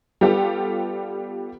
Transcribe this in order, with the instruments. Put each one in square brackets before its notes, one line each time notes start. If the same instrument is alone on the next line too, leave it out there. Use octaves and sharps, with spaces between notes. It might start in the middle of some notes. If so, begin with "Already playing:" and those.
[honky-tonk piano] G3 B3 F4 G4 A4